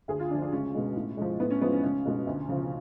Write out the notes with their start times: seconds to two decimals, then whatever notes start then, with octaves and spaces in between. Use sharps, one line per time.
0.08 D2 G#4
0.19 F4
0.30 D3 D4
0.34 F3
0.42 D4
0.52 C#2 C#4
0.75 B2 G#3
0.96 A2
1.17 F3 G#3
1.40 A2 B3
1.50 C#4
1.61 F3 G#3 B3
1.72 C#4
1.83 C#2 C#4
2.06 B2 G#3
2.27 D2
2.49 C#3 F3